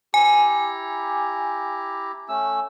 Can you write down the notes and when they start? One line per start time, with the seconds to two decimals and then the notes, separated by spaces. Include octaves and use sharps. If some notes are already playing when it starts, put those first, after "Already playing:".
0.14 E4 G4 G#5 A#5
2.29 A3 C#4 E6